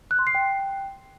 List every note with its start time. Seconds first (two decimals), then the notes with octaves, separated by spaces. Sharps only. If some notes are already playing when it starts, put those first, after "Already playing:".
0.11 F#6
0.19 C6
0.27 C7
0.35 G5